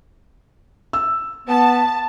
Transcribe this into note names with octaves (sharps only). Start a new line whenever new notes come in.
E6
B3 A5